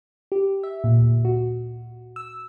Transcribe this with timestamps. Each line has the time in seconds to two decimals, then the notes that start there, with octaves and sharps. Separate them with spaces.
0.32 G4
0.63 E5
0.84 A#2
1.02 D2
1.25 F#4
2.16 E6